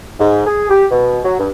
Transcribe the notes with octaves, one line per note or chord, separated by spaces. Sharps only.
G#2
G#4
G4
B2
F#3
G2